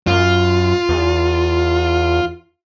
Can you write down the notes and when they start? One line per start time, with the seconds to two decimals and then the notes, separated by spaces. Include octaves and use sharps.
0.07 F#2 F4
0.89 E2